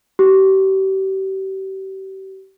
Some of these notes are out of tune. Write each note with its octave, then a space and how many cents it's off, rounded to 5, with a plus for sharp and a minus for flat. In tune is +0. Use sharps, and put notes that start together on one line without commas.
G4 -35